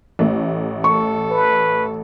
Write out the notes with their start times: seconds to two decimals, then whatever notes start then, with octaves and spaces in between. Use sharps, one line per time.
0.19 A1 A3
0.84 A4 C#6
1.31 B4